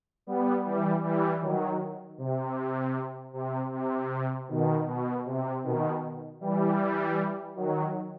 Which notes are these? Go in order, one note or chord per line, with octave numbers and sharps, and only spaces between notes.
G3 B3
E3 G3
E3 G3
D#3 F#3
C3
C3
C3
B2 D#3
B2
C3
B2 D#3
E3 G3
D#3 F#3